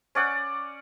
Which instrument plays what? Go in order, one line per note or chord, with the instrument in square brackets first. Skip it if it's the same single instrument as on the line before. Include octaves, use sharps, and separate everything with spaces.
[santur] C#4 D5 F#5